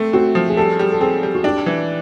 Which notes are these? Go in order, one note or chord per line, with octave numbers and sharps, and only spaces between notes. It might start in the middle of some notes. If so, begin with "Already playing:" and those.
Already playing: A3 C4
C4 F#4
F3
G#4
G3 A4
G3
A4
C4 G#4
G3
F#4
D4 G4
E3